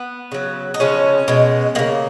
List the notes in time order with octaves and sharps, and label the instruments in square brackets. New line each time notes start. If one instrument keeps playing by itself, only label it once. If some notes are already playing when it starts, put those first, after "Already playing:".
Already playing: [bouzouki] B3
C#3 F#3
D#4
C#3 F3 G#3 C#4
B2 G#3
C#3 G#3 A#3